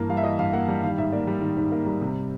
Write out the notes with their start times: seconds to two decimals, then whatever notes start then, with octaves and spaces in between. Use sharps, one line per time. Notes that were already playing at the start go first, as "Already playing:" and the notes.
Already playing: G2 E3 A#3
0.09 G3 F5
0.17 E5
0.24 E3 D#5
0.39 G2 F5
0.53 A#3 F#5
0.68 G3
0.83 D#3 F5
0.98 G#2 E5
1.12 A#3 D5
1.27 G3
1.42 D#3
1.57 G#2
1.72 A#3
1.86 G3
2.01 C3